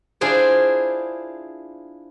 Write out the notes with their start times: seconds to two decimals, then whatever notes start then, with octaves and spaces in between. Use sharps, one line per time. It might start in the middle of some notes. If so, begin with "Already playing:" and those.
0.21 D4 E4 F4 G#4 C5 D5